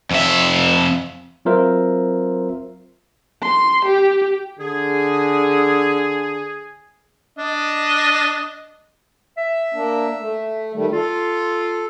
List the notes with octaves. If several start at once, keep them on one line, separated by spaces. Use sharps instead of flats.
F2 E5
F#3 C4 F4 A#4 C5 E5
C6
G4
D3 G#4
D4 D#5
E5
A#3 D4
A3
D#3 G3 A3
F4 A4